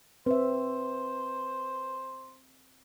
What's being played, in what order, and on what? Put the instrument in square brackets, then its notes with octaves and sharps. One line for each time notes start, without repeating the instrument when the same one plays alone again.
[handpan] C4 E5 [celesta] B4 [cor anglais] C5